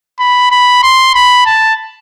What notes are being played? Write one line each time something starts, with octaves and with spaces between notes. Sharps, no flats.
B5
B5
C6
B5
A5